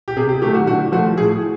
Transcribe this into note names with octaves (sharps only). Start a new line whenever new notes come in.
G4
C3 G#4
G4
D#3 F#3 A3 G4
F#4
D3 F#4
F3 A3 F#4
A2 G#4